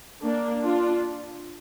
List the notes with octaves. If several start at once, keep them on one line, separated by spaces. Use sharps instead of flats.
A#3 D4
D4 F4